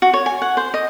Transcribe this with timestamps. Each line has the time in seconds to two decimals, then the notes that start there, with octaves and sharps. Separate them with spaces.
0.02 F#4
0.14 C#5
0.26 G#5
0.42 F#5
0.57 C5
0.74 D#5